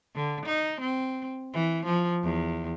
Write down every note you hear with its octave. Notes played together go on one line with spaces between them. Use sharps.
D3
D#4
C4
E3
F3
E2